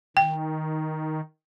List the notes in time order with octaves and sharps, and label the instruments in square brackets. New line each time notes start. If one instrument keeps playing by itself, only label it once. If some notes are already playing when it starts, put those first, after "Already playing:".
[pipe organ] D#3 [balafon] G5